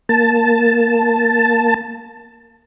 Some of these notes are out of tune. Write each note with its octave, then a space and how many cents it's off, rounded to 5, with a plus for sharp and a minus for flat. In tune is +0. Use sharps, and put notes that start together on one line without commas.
A#3 +0 A5 +0